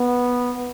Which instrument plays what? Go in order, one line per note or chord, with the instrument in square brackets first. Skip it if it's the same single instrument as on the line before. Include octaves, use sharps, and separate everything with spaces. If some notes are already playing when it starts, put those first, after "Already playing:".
Already playing: [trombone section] B3